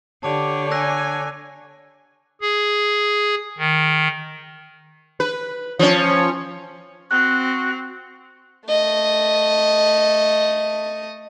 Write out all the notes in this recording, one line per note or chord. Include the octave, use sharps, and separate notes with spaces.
D3 G4 C#5 A5 D6 F7
G#5 E6 F#6 A#6
G#4
D#3
B4
F3 C#4
C4 F#4 F#6
A3 D#5